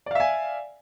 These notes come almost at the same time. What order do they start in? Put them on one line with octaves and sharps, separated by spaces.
D5 F5 E5 G#5